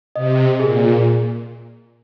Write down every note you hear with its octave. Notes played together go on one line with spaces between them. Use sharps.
C3 D#5
A#2 G#4